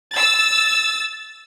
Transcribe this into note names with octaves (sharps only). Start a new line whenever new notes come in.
E6 A6